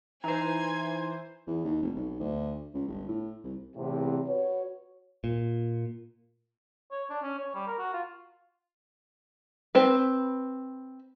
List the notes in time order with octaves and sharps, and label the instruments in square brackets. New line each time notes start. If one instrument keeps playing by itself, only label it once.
[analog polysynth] E3 C5 [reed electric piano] D#4 B4 [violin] G#5 G#6 [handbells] A#5
[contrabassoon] E2
D#2
F1
B1
D2
C#2
G1
A2
C2
[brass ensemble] B1 E2 A2 C3
F#4 B4 C#5
[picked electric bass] A#2
[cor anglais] C#5
D4
C#4
C#5
G3
A#4
F#4
F4
[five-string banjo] C4 B4